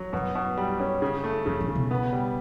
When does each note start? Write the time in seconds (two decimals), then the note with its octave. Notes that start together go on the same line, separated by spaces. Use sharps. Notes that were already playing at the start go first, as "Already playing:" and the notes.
Already playing: F#3
0.13 F#2 B2
0.35 B2
0.57 G3
0.80 C#4
1.02 C#3
1.24 A3
1.46 F#2 C#3
1.61 A2
1.68 C#3
1.75 B2
1.91 B3
2.13 G3